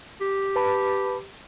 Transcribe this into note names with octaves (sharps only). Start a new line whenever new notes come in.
G4
B4 A5 B5